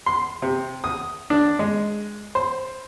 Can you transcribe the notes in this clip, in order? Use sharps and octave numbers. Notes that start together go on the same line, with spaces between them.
C6
C3
D#6
D4
G#3
C5